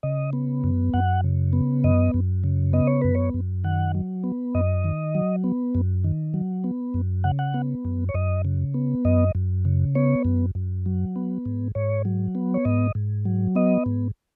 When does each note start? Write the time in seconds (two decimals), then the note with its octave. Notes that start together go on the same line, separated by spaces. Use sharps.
0.03 C#3 D#5
0.33 B3
0.64 F#2
0.94 F#2 F#5
1.24 C#3
1.53 B3
1.84 F#2 D#5
2.14 F#2
2.44 C#3
2.73 B3 D#5
2.87 C#5
3.02 F#2 B4
3.15 C#5
3.34 F#2
3.64 D#3 F#5
3.95 F#3
4.24 B3
4.55 F#2 D#5
4.84 D#3
5.15 F#3
5.44 B3
5.75 F#2
6.04 D#3
6.34 F#3
6.64 B3
6.94 F#2
7.24 C#3 F#5
7.39 F#5
7.54 B3
7.85 F#2
8.09 C#5
8.14 F#2 D#5
8.45 C#3
8.74 B3
9.05 F#2 D#5
9.35 F#2
9.65 C#3
9.95 B3 C#5
10.25 F#2
10.55 F#2
10.86 F#3
11.16 B3
11.45 G#2
11.75 G#2 C#5
12.05 F#3
12.35 B3
12.54 C#5
12.65 G#2 D#5
12.95 G#2
13.25 F#3
13.55 B3 D#5
13.86 G#2